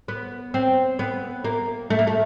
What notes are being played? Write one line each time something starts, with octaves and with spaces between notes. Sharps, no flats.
B3
C4
B3
A#3
A3
A#3
A3